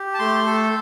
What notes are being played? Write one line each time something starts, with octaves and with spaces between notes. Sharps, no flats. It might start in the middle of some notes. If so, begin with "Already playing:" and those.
Already playing: G4
A5
A3 C6
A4